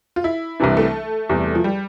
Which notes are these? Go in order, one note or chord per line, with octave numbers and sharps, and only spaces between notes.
F4
E4
C2 C3 E3 D4
A3
E2 C3 G3
F3
G3